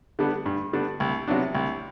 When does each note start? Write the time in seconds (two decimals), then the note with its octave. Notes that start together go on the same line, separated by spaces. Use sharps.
0.19 D3 G3 B3 D4
0.46 G2
0.73 D3 G3 B3 D4
1.00 C2
1.28 C3 F#3 B3 D4
1.55 C2